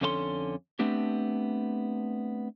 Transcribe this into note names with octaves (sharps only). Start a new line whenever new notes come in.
F2 D3 C#4 F4 A4 C6
A3 B3 C4 D4 G4